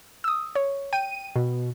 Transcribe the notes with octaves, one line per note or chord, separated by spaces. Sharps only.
D#6 E6
C#5
G5 D#7
B2